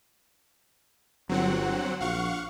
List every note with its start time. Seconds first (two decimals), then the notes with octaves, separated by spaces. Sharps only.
1.29 G1 F#3 C4 F#5
2.00 A#1 F5 F#5 C#6